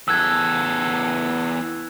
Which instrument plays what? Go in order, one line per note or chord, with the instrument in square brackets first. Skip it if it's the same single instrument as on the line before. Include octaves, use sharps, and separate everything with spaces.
[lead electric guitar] E2 A4 [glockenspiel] E6 F#6 G#6